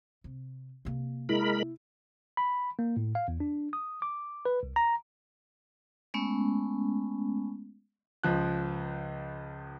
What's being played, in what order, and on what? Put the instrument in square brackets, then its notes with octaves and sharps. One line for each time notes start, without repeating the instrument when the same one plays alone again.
[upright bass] C3
C3 A#3
[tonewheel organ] G#3 A#4 B5 [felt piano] E4
[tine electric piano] B5
A#3
A2
F5
E2
D4
D#6
D6
B4
C2
A#5
[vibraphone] G#3 A3 B3 C#4
[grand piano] C#2 F3 F#6